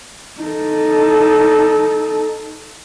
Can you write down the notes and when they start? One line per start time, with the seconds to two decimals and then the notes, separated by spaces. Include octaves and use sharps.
0.41 D#4 A4